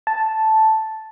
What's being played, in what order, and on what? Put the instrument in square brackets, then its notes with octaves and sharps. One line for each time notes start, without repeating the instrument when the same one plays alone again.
[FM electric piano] A5